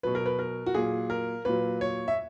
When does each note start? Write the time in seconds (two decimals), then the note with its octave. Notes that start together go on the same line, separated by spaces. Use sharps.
0.03 B2 F#3 B4
0.15 A#4
0.26 B4
0.39 A#4
0.66 F#4
0.74 A#2 F#3 G#4
1.10 A#4
1.45 A#2 F#3 B4
1.81 C#5
2.08 E5